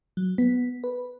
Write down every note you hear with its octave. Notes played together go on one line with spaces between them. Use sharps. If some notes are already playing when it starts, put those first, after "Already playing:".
F#3
B3
B4